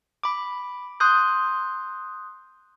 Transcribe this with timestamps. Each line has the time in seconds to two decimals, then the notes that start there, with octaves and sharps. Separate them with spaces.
0.23 B5 D6
1.00 C6 D#6 F#6 G6